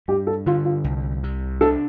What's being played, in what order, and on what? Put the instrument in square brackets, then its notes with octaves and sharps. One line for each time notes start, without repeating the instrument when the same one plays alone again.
[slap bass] G2 [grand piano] G4
[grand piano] A4
[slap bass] D3 [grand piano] F4
[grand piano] F4
[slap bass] C2
C3
[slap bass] D4 [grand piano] A4